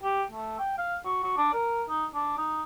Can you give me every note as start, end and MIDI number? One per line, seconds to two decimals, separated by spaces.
0.03 0.24 67
0.31 0.56 57
0.59 0.77 79
0.78 0.96 77
1.05 1.20 66
1.23 1.33 66
1.37 1.49 62
1.53 1.83 70
1.89 2.05 63
2.14 2.35 62
2.37 2.63 63